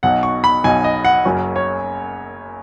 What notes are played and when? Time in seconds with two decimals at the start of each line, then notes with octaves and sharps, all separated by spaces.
0.03 B1 B2 F#3 D#4 F#5
0.23 C#6
0.44 B5
0.64 B1 B2 F#3 D#4 G#5
0.84 D#5
1.05 F#5
1.25 F#1 F#2 F#3 C#4
1.56 C#5